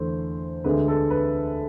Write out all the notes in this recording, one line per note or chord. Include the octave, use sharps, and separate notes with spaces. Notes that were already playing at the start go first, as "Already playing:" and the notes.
Already playing: E2 D3 A3 C5
D2 D3 G#3 B4
A4
B4